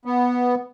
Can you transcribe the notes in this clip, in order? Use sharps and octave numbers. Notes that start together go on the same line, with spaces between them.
B3